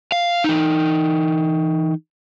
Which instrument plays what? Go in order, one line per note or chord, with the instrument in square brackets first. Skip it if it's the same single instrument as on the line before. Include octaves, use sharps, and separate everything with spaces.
[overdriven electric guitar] F5
E3 D#4